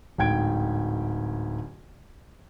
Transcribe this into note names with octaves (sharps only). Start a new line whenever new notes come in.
D1 G#2 G5 G#6 D7